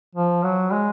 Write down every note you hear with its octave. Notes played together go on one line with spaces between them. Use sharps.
F3
F#3
G#3